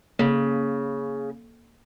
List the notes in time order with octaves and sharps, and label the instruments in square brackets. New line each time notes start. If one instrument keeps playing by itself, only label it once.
[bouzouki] C#3 [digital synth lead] A#3